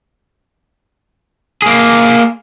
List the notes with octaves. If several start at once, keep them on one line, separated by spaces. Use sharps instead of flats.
A#3 G#4